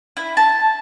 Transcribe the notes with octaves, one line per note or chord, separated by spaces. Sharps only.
E4
A5